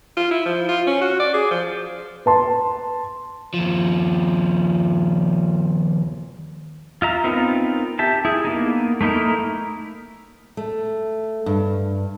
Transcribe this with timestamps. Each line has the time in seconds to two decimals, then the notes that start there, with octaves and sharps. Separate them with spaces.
0.17 F4
0.31 E4
0.45 F3
0.68 F4
0.87 C#4
1.01 F#4
1.20 D5
1.34 G#4
1.51 F3
2.26 B4 A5 C6
3.54 D#2 F3
7.02 F4 E5 A#5
7.24 B3 C4 D#4 F4 A#4
7.99 G4 E5 A5
8.25 E4 G#4
8.45 A#3 B3 D#4
9.01 A3 A#3 D#4 E4 A#4
10.57 A3
11.46 G2